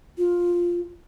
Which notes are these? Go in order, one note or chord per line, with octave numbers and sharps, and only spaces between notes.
F4